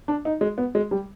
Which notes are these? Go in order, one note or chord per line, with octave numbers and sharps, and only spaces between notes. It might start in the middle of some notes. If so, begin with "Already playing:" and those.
D4
D#4
G#3
B3
G#3
G3